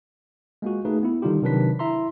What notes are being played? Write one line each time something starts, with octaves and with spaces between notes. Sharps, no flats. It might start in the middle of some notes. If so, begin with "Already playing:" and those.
G#3 A#3 F4 F#4
A3 A#3 D#4 G#4 B4
B3 E4
D3 D#3 G3 D#4 F4 G4
C3 D#3 F#3 D4 B4 B6
E4 E5 A#5 C6